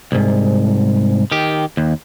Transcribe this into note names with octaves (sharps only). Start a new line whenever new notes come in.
C2 G#2
D#3 G4
D#2